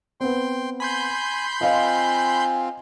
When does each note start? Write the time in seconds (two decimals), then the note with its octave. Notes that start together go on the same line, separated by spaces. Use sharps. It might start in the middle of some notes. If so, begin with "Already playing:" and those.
0.21 B3 C4 G5 C6
0.80 G#5 B5 C6 G6
1.61 C4 F4 D#5 F5 G#5